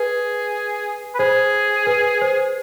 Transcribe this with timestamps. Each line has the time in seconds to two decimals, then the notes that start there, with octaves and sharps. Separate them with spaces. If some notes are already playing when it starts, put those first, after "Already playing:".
Already playing: G#4 B4
1.15 B4
1.19 G#4 C5
1.87 B4
2.22 C5